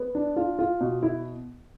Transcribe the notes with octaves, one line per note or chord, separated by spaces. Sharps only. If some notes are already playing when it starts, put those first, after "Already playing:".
Already playing: B3
D4
F4
F4
B2
E4